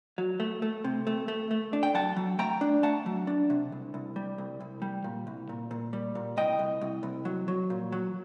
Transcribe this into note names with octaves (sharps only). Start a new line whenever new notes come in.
F#3
A3
A3
C3
A3
A3
A3
D4
G5
F#3 F#5 A5
F#3
A3 G5 A#5
D4
A3 F#5 A5
F#3
D4
C3
C2
C2
G3
C2
C2
G3
A#2
C2
A#2
A#2
G3
A#2
C2 D#5 G5
C2
C2
C2
F#3
F#3
A#2
F#3